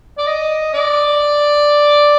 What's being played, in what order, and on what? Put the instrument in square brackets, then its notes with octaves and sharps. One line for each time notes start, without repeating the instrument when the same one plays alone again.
[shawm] D5
D#5
D5